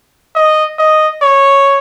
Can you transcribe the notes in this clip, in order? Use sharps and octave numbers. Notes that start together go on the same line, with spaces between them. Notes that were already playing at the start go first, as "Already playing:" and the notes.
D#5
D#5
C#5